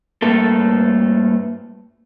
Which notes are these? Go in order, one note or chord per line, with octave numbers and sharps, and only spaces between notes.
G2 A3 A#3 A4